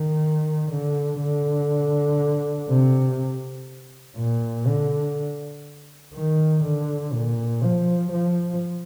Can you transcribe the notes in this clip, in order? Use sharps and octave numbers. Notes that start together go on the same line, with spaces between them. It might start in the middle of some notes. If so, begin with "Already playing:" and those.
Already playing: D#3
D3
D3
C3
A#2
D3
D#3
D3
A#2
F3
F3